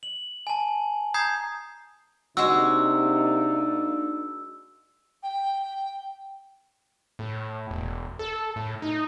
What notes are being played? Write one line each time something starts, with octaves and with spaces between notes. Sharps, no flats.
F#7
G#5 A5
A#5 D#6 G6 G#6 C7
C3 G#3 A#3 D4 D#4 F#4 E6
G5
A2
E1
A4
A2
D#4